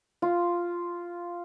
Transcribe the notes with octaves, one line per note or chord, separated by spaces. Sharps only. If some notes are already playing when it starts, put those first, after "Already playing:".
F4